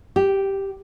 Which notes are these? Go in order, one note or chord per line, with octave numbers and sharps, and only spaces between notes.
G4